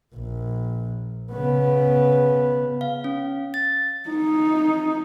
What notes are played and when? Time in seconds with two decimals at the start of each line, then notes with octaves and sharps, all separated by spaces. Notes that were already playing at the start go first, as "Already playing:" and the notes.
0.15 A#1
1.32 C#3 B3
2.81 F5
3.04 C#4
3.54 A6
4.10 D#4